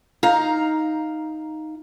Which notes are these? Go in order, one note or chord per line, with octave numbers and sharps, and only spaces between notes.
D#4 F5 A#5